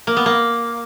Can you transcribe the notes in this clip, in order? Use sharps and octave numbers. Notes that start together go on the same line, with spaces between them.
A#3
B3
A#3